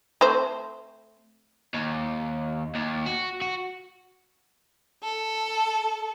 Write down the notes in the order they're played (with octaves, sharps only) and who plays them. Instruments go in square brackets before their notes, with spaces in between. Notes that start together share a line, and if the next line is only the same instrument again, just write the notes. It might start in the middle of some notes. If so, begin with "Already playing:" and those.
[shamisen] A3 C4 C5
[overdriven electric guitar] D#2
D#2
F#4
F#4
[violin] A4